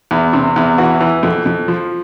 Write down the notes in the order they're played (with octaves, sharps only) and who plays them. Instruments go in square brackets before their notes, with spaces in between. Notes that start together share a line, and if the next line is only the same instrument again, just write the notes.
[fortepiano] E2
C3
E2
E3 F#4
E3
F2
F2
F3